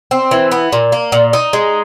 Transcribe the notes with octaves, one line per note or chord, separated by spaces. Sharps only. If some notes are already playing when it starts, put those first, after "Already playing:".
C4
E3
B3
A#2
A#3
A#2
D#4
G#3